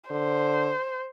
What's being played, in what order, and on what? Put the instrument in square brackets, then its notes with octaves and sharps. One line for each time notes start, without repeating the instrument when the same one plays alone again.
[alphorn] D3 [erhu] C5